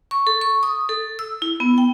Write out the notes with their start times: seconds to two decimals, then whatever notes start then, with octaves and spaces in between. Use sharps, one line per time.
0.11 C#6
0.27 A4
0.41 C#6
0.63 D#6
0.89 A4
1.19 E6
1.42 E4
1.60 B3
1.78 G5